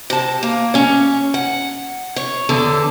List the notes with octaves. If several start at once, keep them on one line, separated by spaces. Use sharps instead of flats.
C3 A5
A#3
C#4 C#5
F#5
C#5
E2 D3 A4